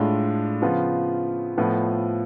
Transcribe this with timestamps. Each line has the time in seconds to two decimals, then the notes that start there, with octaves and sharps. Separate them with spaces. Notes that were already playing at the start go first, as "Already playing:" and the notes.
Already playing: A2 G#3 D4 F4
0.62 C#3 F3 B3 F4
1.57 A2 F3 B3 F4